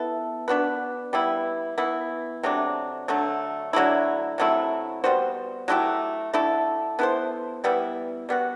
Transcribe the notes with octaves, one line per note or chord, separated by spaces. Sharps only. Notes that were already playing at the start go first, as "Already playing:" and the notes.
Already playing: B3 E4 A4
B3 D4 F#4 B4
G3 B3 E4
E3 B3 E4
C3 F#3 A3 D4
D3 F#3 A3
D3 F#3 A3 E4
C3 F#3 A3 E4
G3 B3 F#4 C5
F#3 A3 E4 G4
D3 A3 E4 A4
B3 E4 A4 C5
E3 G3 B3 E4
G3 B3 F#4